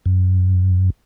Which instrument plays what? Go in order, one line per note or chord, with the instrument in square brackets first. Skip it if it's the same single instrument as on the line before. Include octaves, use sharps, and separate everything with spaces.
[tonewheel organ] F#2